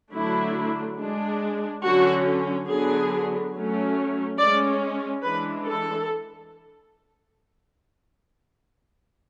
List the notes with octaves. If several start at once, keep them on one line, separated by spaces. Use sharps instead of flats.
D3 F#3 A3 D4 E4
G#3 D4
D3 F#3 C#4 F#4
D3 F#3 B3 D4 G#4
F#3 A3 C#4
G#3 C#4 D5
E3 G#3 D4 B4
A4